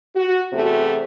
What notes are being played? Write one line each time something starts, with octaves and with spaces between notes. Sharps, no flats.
F#4
E2 C3 A3 A4